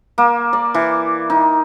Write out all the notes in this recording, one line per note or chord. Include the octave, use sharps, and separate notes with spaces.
A#3
D5
E3
D#4